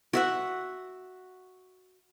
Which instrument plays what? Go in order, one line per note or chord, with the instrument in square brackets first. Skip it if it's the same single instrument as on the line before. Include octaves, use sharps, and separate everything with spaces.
[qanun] F#4 E5 F#5